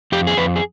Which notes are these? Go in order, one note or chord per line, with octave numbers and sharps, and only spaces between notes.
F2 G4
G#4
F2 B4
G#4